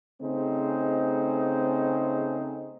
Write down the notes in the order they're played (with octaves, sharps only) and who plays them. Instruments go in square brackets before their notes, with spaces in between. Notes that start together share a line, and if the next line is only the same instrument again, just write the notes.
[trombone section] C#3 A3 C4 D#4 G#4 C5